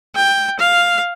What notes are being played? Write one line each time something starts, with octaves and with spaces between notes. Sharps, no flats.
G5
F5